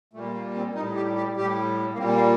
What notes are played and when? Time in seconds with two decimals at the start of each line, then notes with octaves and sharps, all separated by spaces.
0.13 A#2 G3 A3
0.34 A#3
0.55 C4
0.75 A2 G3 D#4
0.95 G4
1.16 G4
1.36 A2 G3 G4
1.93 A#3
1.98 A#2 G3 C4
2.14 A#3